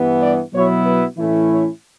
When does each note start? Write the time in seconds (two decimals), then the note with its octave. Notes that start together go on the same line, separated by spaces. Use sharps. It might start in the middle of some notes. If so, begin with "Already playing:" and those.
Already playing: G2 E3 B3
0.21 D5
0.54 B2 F#3 B3 E4 C#5
0.85 B4
1.17 A2 E3 A3 C#4 E4
1.50 C#5